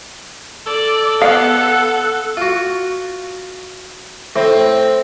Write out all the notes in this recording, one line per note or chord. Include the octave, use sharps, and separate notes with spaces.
A4 D5
B3 F5 F#5 C#7
F4 F#4
A2 C4